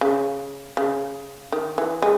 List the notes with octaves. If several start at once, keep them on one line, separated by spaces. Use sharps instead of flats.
C#3
C#3
D#3
E3
G#3